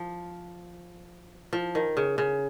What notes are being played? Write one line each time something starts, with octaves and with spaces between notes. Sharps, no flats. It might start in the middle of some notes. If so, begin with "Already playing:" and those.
Already playing: F3
F3
D#3
C#3
C#3